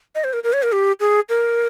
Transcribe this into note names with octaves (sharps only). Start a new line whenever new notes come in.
D#5
C5
A#4
A#4
C#5
A#4
G4
G#4
A#4